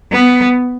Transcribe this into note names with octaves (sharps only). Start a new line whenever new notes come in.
B3